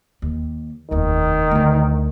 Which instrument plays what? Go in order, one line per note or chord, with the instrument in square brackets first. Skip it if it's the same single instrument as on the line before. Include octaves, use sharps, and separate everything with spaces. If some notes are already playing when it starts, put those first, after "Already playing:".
[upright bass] D#2
[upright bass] F1 D#2 [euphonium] D#3
[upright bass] D2 D#4